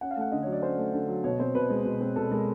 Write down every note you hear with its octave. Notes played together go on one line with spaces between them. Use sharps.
C#4 F#5
F5
A3 F#5
D3 D#5
C#5
F#3
D5
C#4 C5
A3
D3
F#3
B2 C#5
C4 C5
B2 B4
G#3
B2
C4
B2 A4
G#3 A#4